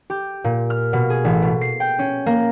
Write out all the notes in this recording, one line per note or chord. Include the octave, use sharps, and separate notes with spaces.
G4
A#2
F6
B2
G#4
A1
B2
C7
G5
C#4
A#3